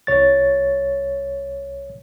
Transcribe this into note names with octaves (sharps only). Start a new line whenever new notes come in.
C2 C#5 A6